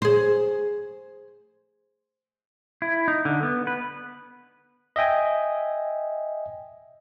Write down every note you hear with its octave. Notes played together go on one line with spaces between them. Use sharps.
G#4 C5
E4
D#4
D3
B3
B4
D#5 E5 G5 G#5